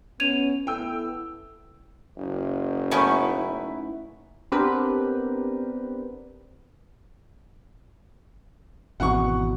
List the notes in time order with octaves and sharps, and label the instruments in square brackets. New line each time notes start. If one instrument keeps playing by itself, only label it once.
[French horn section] B3 C#4 [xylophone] G#6 D#7 F7
[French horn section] B3 E4 A4 [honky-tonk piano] G5 E6
[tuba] F#1
[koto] A3 B3 C#4 [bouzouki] D#4 E4 B4
[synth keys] B3 C4 D4 G4 A#4 B4
[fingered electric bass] G#1 E2 B2 [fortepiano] F#5 C#6